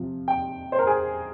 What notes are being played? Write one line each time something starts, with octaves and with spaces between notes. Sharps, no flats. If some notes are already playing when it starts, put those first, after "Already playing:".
Already playing: C3 F3
G5
C5
A#4
G#4